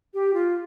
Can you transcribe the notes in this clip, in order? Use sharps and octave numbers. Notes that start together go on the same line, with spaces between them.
G4
F4